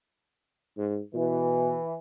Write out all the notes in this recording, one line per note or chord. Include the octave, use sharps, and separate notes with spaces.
G#2
B2 E3